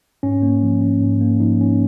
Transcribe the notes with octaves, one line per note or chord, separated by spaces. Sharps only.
G#2 C#4
A#3
F3
C#4
G#2
A#3
F3 D#4
C#4